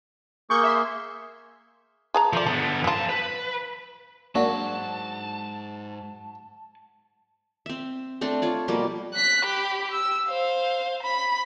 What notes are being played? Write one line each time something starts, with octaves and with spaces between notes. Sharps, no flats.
A#3 G#4 C#6 G6
E5 C6
G#4 A5 A#5
F3 A3 D5
D3 B3 A4
F#2 F3 F4 A5
B4
G#2 F#3 A#3 D4 F#4 A5
C4 E5
A3 C4 D4 A4
F4 C#5 D5
B2 F3 G3 A#3
F#6 B6
G4 B5
E6
C5 F5
B5